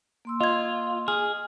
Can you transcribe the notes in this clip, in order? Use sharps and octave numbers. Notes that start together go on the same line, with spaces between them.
A#3 C6 E6
F4 D#5 G#6
G#4 F6